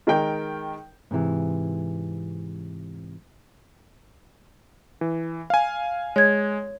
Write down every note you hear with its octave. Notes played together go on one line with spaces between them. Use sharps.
D#3 G#3 A#4 G5 G6
G#2 C3 E3
E3
F5 G#5
G#3 C#5 G#6